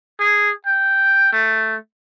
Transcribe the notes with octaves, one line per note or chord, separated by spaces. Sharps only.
G#4
G5
A3